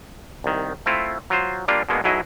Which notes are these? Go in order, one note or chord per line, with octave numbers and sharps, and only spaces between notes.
C2 D#3
A3 C4 E4 F4
F#3 F4 C5
G3 A#3 D4 F4
B2 D3 G#3 A#3 B3
B1 B2 F#3 E4 G#4 D#5